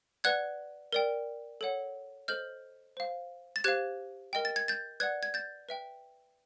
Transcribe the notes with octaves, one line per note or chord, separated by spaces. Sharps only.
B4 D5 F#5 F#6 G#6
A#4 D5 G5
A4 C#5 F#5
A4 C5 D#5 F6 G6
C5 F5
A6
G4 C5 F5 F#6 G#6
A#4 D#5 G5
A6
G#6
G6 A6
B4 D5 F#5 F#6 G#6
G#6
G6 A6
B4 E5 G5